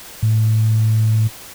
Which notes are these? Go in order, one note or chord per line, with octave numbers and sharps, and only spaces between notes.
A2